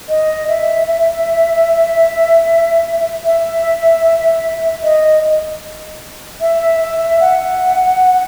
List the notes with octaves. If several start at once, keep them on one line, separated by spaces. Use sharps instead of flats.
D#5
E5
E5
E5
D#5
E5
E5
F#5